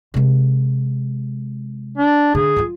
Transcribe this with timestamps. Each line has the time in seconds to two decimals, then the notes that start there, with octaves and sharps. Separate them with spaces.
0.14 C3 G#3
1.98 D4
2.35 D3 G#4
2.56 F#3 F4